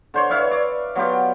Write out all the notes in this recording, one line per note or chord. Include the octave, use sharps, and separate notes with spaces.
D3 C5 C#5
B4 C#5 E5 F5
D5
F#3 B3 F4 G4